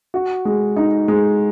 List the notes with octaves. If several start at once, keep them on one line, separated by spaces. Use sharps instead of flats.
F#4
G#3
D#4
G#3